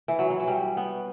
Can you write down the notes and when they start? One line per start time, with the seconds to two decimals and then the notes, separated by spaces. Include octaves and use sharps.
0.08 E3
0.19 F#3
0.30 E3
0.40 F#3
0.48 G3
0.77 B3